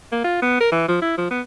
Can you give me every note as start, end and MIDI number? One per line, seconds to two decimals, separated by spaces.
0.12 0.21 58
0.24 0.37 65
0.42 0.58 59
0.60 0.69 70
0.72 0.87 52
0.88 1.00 53
1.02 1.15 64
1.18 1.29 53
1.31 1.41 59